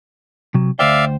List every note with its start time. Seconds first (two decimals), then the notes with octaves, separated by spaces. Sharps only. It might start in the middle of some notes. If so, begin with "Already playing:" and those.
0.54 C3 F#3
0.79 D2 C5 D5 E5 F5 G5